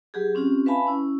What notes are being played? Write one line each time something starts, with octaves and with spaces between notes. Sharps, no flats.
F#3 G4 G#4
C4 C#4 F4 G4
B4 E5 F5 G#5 A5 B5
C#4 E4